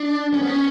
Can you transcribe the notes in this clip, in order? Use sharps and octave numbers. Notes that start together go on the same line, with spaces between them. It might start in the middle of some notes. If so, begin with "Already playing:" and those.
Already playing: D4
C#4
B3
C#4